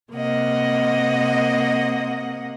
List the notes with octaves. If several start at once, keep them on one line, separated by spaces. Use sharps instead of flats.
C3 A#3 D#5 F#5